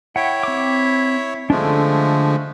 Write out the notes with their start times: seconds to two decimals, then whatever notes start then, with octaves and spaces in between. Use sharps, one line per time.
0.16 E4 C#5 E5 F#5 G5
0.43 C4 D6
1.50 D3 F3 G#3 A3 D4